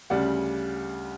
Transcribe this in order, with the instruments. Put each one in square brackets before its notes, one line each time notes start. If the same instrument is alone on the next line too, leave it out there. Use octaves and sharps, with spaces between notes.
[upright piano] D2 C#3 G3 D5 F#5